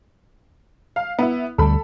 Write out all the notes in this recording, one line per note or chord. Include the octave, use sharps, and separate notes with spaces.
F5
B3 E4
D2 G3 A4 B5